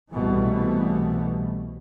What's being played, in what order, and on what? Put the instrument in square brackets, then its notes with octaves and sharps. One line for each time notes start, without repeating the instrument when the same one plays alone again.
[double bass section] C2 B2 E3 G3 A3